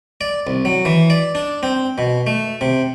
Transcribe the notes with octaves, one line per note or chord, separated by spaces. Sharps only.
D5
C2
F#3
E3
D5
D4
C4
B2
A3
C3